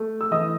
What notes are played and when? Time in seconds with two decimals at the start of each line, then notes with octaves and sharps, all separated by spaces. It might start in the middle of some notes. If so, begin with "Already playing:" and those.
Already playing: A3
0.21 E6
0.31 E3 D#5 D#6